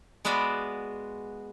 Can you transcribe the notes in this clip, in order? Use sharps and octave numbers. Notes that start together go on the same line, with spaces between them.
G#3 B3 F#4 D5 E5 F5